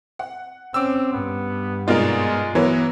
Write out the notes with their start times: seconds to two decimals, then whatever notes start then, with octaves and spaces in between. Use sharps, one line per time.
0.19 F#5
0.74 C4 C#4 D6 E6
1.13 G2 B3
1.88 G#2 B2 G#3 D#4 F4 A#4 D5
2.55 E3 F#3 B3 A#4 C#5